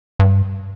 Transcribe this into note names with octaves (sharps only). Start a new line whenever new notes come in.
G2